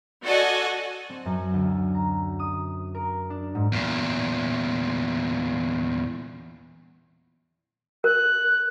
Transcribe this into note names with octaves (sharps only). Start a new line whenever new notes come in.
F#4 A4 D5 D#5 F#5 G#5
C4
F#2
D2
A#5
D#6
A#4
D4
G#2
E2 A#2
A#4 F#6